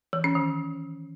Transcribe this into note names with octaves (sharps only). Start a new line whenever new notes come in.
E3
C#4
D#3